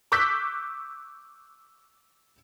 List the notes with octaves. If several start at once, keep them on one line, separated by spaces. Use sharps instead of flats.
C#6 D6 E6 F#6 G6 B6